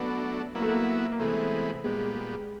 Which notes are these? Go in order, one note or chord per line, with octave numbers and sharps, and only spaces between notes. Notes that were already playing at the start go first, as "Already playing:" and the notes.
Already playing: F#3 A3 B3 D4
F#3 A#3 B3 E4
A3
A#3
A#3
C3 E3 G#3 A3 B3
A#2 G3 G#3 B3
G#3